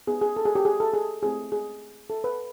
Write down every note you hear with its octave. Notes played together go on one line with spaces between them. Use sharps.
B3 D#4 G4 G#4
G#4
A4
G#4
G4
G#4
A4
G#4
A3 C4 E4 G4 G#4
G#4
A4
B4